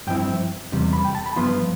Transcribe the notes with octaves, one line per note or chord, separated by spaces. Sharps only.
G2 F3 C4 E4 G5
E2 C3 G3
B5
G5
A5
B5
G2 F3 B3 F4 C6